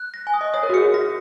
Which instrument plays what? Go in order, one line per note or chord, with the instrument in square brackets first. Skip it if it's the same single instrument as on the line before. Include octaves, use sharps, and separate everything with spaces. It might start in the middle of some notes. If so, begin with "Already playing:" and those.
Already playing: [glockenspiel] F#6
A#6
[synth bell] G#5
[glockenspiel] D#6
[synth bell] D#5
[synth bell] C#5 [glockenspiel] D#6
[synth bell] A#4
F#4
[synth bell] G#4 [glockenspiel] C#7
[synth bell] F#4
[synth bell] F#4 [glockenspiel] A#6